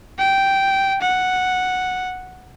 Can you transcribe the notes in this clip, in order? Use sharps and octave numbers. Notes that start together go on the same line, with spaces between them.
G5
F#5